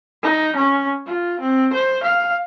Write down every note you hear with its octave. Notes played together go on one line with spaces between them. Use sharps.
D#4
C#4
F4
C4
C5
F5